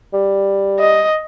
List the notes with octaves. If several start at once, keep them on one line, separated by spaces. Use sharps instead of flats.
G3
D#5